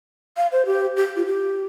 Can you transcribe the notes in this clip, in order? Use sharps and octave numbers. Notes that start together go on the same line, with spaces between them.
F5
C5
G4
G4
F4
G4